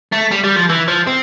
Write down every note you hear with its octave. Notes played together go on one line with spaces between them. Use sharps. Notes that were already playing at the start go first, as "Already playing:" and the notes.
A3
G3
G3
F3
E3
F3
C4